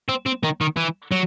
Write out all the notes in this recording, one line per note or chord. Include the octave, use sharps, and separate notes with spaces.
C4
C4
D#3
D#3
E3
F#3